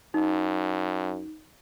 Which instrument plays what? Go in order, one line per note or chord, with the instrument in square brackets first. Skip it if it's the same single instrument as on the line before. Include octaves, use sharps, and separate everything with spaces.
[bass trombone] F#2 [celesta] D#4